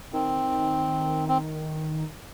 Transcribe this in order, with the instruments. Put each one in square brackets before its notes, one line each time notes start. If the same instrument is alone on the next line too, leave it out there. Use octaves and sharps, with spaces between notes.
[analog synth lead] D#3 [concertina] C4
[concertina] C4